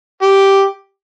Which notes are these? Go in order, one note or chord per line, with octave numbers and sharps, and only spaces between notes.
G4